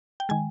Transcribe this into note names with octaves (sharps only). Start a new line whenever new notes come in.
G5
D#3 G#3 G#5